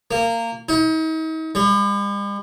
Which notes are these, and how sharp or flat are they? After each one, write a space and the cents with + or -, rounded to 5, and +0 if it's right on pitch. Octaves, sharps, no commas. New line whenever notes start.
A#3 -20
D#4 +40
G3 +45